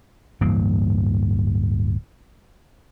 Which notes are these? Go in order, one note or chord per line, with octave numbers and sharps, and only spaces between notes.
D1 G2 E3 A#3